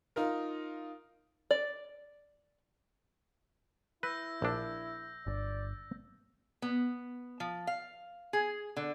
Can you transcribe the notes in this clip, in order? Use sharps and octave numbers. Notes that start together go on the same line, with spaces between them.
D#4 F4 A#4
D5
E4 B4 E6 G6 A#6
A#1 D4
G1 D5
B3
F3
F5
G#4
D3